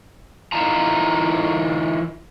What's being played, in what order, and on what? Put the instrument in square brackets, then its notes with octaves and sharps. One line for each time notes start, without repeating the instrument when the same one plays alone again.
[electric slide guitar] E3 D#4 F4 A5 A#5